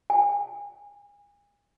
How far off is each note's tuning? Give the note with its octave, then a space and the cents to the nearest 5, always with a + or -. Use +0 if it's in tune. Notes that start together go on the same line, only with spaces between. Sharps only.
G#5 -30